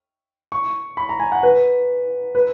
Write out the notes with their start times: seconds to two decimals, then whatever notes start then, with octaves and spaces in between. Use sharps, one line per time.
0.52 C#6
0.97 B5
1.09 A#5
1.20 G#5
1.32 F#5
1.43 B4
2.35 B4